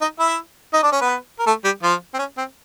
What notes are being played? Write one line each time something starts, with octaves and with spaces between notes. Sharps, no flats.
D#4 D#5
E4 E5
D#4 D#5
D4 D5
C#4 C#5
B3 B4
A#4
A3 A4
G3 G4
F3 F4
C4
C#4
C4